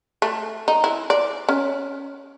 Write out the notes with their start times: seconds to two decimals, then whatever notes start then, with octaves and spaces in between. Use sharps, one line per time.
0.22 A3
0.68 D#4
0.84 E4
1.10 D5
1.49 C#4